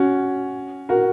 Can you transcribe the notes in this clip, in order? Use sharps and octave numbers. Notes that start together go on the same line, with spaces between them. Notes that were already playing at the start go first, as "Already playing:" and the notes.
Already playing: C#4 F#4
F#4 A#4